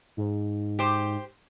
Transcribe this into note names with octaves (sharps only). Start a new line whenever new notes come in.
G#2
G4 C5